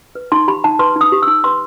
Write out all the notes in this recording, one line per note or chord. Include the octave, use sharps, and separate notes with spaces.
B4
D#4 C6
G4 B5
D#4 A5
B4 C6
D#4
D#6
G4
D#4 E6
B4 C6